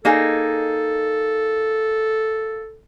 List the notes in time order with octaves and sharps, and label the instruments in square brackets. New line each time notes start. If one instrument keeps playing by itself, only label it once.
[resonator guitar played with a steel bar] A#3 D#4 G#4 [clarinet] A4